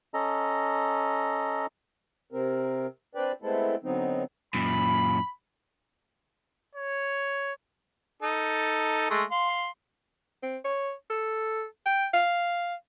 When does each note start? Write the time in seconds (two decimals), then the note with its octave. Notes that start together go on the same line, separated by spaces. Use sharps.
0.14 C#4 A4 D#5 A#5
2.33 C3 C4 A#4
3.15 C4 D4 B4 D5 G5
3.42 G#3 A3 B3 C4 E4 A4
3.84 D3 F#3 B3 C4 D#4
4.54 F#2 A#2 B5
6.75 C#5
8.22 D#4 A4
9.10 G#3 A3
9.31 F5 C6
10.43 C4
10.65 C#5
11.10 A4
11.86 G5
12.13 F5